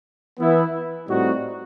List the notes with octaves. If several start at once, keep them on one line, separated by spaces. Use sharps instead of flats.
E3 B3 E4
A2 G3 C4 D#4 F#4